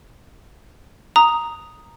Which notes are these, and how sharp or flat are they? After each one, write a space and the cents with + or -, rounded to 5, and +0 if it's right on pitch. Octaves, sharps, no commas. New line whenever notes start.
A#5 +0 D#6 +0